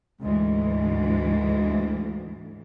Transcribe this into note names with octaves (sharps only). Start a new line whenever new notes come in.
D2 G#2 E3 G#3